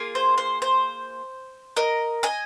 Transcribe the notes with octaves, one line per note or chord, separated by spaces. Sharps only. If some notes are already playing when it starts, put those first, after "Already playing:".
Already playing: A#3 F4 G#4
C5
C5
C5
A#4 D#5
D#5 G#5